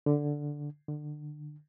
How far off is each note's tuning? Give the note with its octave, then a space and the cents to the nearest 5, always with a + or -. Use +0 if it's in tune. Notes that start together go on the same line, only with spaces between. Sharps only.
D3 -5
D3 +25